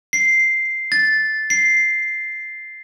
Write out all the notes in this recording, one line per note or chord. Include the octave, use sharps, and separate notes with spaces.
C7
A6
C7